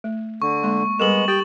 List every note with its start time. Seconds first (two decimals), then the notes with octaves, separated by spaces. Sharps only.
0.04 A3
0.42 D3 C#6
0.63 G#3 A#3 C6
1.00 G3 G#3 B3 A4 A#4 E7 F#7
1.28 G4 G5 A6